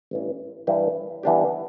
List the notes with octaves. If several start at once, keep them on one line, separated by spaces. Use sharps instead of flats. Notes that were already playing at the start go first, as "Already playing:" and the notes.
A1 G2 E3
G2 E3 G3 D4 G4
G2 E3 B3 D4 G4